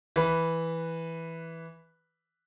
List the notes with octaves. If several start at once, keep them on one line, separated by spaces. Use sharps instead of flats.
E3 B4